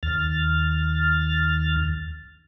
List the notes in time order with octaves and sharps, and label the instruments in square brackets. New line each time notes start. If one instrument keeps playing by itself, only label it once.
[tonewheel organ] D#2 F6 A6